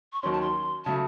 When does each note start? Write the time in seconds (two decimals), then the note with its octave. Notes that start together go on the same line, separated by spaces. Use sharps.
0.13 C#6
0.22 D#2 D#3 F#3 C#4 C6
0.32 A5
0.41 C6
0.85 C#3 F#3 A3 A5